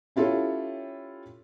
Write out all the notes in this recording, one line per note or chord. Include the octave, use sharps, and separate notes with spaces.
C#4 E4 F4 G4 A4 C#5